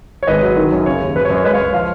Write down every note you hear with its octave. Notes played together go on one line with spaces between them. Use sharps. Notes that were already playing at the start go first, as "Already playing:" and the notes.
C#5
G#1 B4 D#5
F#3
D#3
F#2
C#3 C#5
D#2
F#2 B4
C#5
F#2
C#5
G#3 B4 D#5
C#5 F5
C#2
F3 C#5 F5